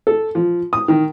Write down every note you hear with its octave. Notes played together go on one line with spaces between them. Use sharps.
A4
F3
D#6
D#3